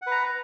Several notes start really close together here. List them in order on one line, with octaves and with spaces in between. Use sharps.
F#5 B4 A#5